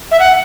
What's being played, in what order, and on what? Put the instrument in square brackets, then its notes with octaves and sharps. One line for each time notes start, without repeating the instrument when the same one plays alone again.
[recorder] E5
F#5